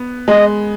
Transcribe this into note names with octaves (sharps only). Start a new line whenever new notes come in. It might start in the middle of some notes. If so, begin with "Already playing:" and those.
Already playing: B3
G#3 D#5